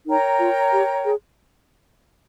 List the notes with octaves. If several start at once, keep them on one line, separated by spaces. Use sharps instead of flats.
D#4 A#4 C#5 G5 A#5
F4
G4
G#4